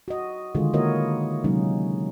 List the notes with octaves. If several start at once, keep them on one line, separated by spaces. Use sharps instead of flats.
F#4 D#5
D3 D#3 G#3 F4 G#4
A#3 E4 F#4 A#4 C#5 D#5
C3 F#3 G#3 A#3 C#4 D#4